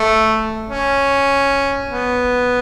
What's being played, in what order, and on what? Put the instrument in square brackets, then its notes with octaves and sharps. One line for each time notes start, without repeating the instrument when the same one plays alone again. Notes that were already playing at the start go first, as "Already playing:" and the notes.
Already playing: [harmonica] A3
C#4
B3